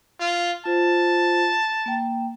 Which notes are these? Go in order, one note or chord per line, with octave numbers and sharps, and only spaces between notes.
F4
F4 C5 A5
A#3 G5